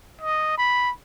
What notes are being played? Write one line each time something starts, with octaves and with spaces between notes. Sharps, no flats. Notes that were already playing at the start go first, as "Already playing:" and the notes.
D#5
B5